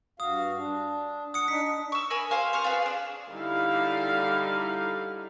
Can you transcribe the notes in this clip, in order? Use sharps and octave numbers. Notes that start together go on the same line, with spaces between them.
G2 F#4 F5 D#6
D4
F#5 D#6 C#7
D4 D#4 B6
C#6 E6
A#4 E5 G#5 B5
G4 C5 F5 G#5
C5 C#6 F6
F4 G#4 B4
D4 G#4
D3 G3 D#4 E4 F5